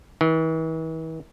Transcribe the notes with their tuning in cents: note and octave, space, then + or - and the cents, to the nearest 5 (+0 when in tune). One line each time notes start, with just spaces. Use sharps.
E3 -40